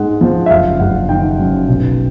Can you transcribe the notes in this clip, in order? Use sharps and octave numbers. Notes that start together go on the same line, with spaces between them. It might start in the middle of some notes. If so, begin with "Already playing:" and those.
Already playing: G#2 G#3 F#5
F3
E5
F#1 F5
F#1 F#5
D#3 G5
F#2
B1